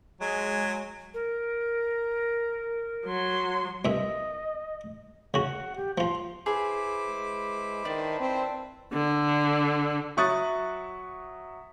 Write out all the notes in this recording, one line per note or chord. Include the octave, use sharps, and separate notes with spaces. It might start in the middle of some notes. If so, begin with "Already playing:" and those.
F#3 G#3 G#5
A#4
F#3 C6
C2 G2 D#5 E5
C#3 F#4 F#5
G4
F3 F4 C6
E4 G#4 B4 C5 D6
G#3
D#3 D4
C4
D3
F#3 E5 C#6 D#6 F#6 A6